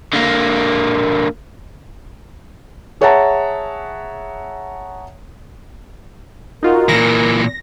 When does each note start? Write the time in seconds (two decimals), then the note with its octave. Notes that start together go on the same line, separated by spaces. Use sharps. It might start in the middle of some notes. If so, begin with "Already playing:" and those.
0.13 D3 A#3
3.01 G#4 C#5 E5 F#5 A5 A#5
6.63 D#4 F4 F#4 A#4
6.89 A#2 E3 A#6